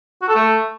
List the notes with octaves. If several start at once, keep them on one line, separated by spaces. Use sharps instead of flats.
F#4
A4
A3